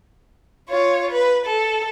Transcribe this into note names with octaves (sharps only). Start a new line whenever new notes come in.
F4 C#5
B4
A4